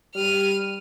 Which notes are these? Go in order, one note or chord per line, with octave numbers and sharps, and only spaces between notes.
G3 F6 D#7